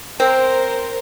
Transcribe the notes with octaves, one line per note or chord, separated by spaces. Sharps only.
C4 A#4 C5